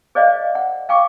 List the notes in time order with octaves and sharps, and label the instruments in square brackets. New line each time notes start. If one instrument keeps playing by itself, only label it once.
[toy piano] G#4 C5 D5 D#5 F5
F#5
F5 G5 C#6 D6